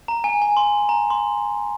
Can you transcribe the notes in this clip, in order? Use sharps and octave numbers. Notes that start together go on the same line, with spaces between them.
A#5
G#5
G#5
C6
A#5
C6